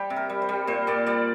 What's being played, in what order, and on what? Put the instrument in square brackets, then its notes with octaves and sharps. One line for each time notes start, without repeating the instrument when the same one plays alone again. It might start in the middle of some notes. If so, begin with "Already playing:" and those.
Already playing: [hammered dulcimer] G3 G4 C5
C3
A#4
G3
C5
G3
A#2 C5
A#2 D5
G3 D5